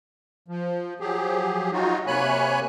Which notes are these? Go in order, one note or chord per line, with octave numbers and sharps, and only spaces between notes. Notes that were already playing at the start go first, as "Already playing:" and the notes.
F3
F3 F#3 G4 G#4
F#3 D#4 F4 F#4
C3 A#3 C#5 G#5 B5 F#6